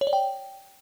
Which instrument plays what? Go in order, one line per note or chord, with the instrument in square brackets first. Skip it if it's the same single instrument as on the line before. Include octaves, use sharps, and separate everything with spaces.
[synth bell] C#5
D5
G5